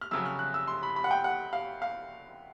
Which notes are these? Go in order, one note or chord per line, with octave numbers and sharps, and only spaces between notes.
F6
F2 C#3 F#3 E6
F6
F#6
E6
C6
B5
B5
F#5
G5
F#5
F5
F5